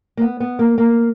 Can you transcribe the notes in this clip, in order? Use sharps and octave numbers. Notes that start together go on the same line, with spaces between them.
A#3
B3
B3
A#3
A#3